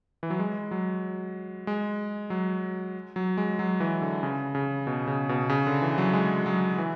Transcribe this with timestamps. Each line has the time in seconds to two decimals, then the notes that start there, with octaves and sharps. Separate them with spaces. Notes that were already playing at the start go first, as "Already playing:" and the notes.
0.23 E3
0.30 F#3
0.39 G#3
0.71 F#3
1.67 G#3
2.30 F#3
3.16 F#3
3.37 G#3
3.59 F#3
3.80 E3
4.02 D3
4.23 C#3
4.55 C#3
4.87 B2
5.07 C#3
5.29 B2
5.49 C#3
5.67 D3
5.82 E3
5.98 F#3
6.13 G#3
6.46 F#3
6.78 E3